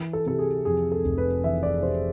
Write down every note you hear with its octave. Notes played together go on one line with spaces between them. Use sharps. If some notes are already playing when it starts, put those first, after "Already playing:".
Already playing: E3
A4
C3 A4
G#4
F2 G#4
A4
F1
B4
E3 E5
D5
C3 C5